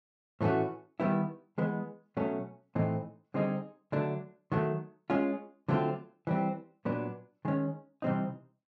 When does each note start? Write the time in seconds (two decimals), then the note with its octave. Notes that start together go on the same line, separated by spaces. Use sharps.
0.41 A2 E3 A3 C#4 F#4
1.00 D#3 G3 B3 E4
1.58 E3 G#3 B3
2.17 B2 F#3 A3 C#4
2.75 A2 E3 A3 C4 D#4
3.34 D3 G3 C4 D#4 G#4
3.92 D3 F#3 A3 D4
4.52 D#3 F#3 A3
5.10 G#3 C#4 F4
5.68 D3 F#3 A3 C4 F4
6.27 E3 G3 C4
6.85 A#2 F#3 B3 D4
7.45 D#3 G#3 C#4
8.02 C3 E3 G3 C4 D#4